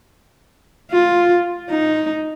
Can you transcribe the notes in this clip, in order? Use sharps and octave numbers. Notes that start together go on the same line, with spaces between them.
F4
D#4